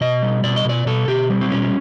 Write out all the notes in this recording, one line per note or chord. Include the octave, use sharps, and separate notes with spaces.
B2 D#5
G3
B2 D5
D#5
B2 D5
B2 A4
B2 G4
G3
C4
B2 C#4